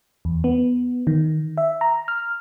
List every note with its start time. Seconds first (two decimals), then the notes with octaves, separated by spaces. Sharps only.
0.25 E2
0.44 B3
1.07 D#3
1.58 E5
1.81 A#5
2.08 F6